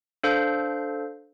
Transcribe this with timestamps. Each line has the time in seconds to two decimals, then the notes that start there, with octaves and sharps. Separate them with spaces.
0.23 D4 A4 C5 F5 G6